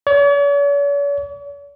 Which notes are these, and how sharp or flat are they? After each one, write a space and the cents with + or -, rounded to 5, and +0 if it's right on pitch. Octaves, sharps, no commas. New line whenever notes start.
C#5 +45